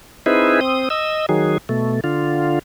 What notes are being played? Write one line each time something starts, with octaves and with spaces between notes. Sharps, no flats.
C4 D#4 E4 G#4 B4
C4 D#6
D#5 E6
D#3 F#3 G#4
B2 A3
D3 F4